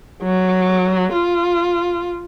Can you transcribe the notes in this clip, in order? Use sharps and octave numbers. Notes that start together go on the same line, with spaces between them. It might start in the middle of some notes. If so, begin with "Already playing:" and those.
F#3
F4